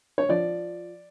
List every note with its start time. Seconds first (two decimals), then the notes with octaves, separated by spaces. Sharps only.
0.18 C#5
0.29 F3 D5